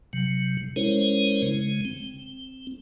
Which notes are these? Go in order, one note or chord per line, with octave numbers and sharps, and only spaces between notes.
C3 F#3
G#3 C#4 E4 A#4 C5 C#5
C#3 G#3
C4